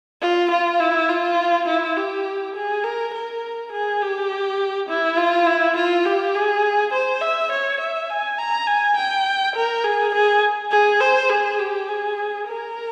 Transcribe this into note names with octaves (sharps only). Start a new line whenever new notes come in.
F4
F4
E4
F4
E4
G4
G#4
A#4
A#4
G#4
G4
E4
F4
E4
F4
G4
G#4
C5
E5
C#5
E5
G#5
A#5
G#5
G5
A#4
G#4
G#4
G#4
C5
G#4
G4
G#4
A#4